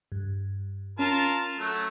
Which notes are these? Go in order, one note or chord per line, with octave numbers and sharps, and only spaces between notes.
G2
C#4 F4 A#4 A5
F#3 A3